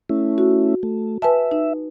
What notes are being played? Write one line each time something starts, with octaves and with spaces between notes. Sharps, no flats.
A3 C#4 E4
F#4
A3
B4 E5 G#5 A5
D#4